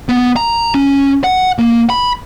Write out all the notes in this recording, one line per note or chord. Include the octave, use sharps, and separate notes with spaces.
B3
A#5
C#4
F#5
A#3
B5